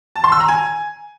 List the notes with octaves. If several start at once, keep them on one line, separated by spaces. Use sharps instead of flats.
A5
C6
E6
A#5
G#5